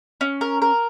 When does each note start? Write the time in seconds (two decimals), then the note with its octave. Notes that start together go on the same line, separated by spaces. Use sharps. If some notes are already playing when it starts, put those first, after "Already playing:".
0.21 C#4
0.41 A#4
0.62 A#4